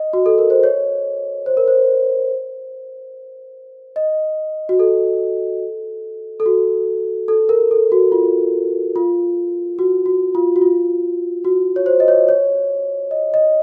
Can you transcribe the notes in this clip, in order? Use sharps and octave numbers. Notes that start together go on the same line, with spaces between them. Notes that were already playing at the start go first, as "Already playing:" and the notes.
Already playing: D#5
F#4
A4
A#4
C5
C#5
C5
A#4
C5
D#5
F#4
A4
A4
F#4
A4
A#4
A4
F#4
F4
F4
F#4
F#4
F4
F#4
F4
F#4
C#5
C5
D#5
C#5
C#5
D#5
D#5